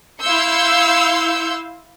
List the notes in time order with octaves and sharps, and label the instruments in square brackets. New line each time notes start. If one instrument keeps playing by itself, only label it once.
[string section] E4 F5 C6 E6 G6 C#7